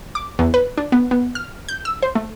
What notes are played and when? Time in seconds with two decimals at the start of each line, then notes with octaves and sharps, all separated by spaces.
0.15 D6
0.39 E2
0.54 B4
0.77 D4
0.92 B3
1.11 B3
1.35 F6
1.69 G6
1.85 E6
2.03 C5
2.15 A3